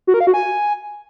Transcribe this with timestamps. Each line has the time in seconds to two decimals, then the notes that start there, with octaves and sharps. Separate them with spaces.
0.07 F#4
0.14 A#4
0.21 F5
0.27 F#4
0.34 G#5